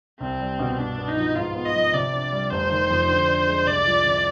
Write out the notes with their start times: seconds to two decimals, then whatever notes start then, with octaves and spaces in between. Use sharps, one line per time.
0.20 C2 C4
0.40 G3
0.59 B2
0.79 G2 D4
0.98 B3
1.08 D#4
1.17 F3
1.36 G#2 F4
1.55 B3
1.65 D#5
1.75 F3
1.94 C3 D5
2.13 D4
2.32 G3
2.51 F1 C5
2.71 D#3
2.90 F2
3.09 D3
3.28 D4
3.47 G#3
3.66 C2 D5
3.85 F3
4.05 C3